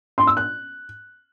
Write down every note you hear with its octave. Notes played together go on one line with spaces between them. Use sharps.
C6
E6
F#6